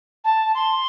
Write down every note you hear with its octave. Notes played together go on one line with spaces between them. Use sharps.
A5
C6